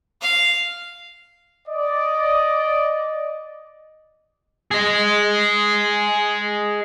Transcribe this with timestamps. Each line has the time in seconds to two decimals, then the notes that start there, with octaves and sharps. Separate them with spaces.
0.21 F5
1.68 D5 D#5
4.71 G#4 D#5